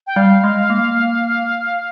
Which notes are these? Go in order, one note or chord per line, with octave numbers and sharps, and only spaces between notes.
G5
G3 F5
G#3
A#3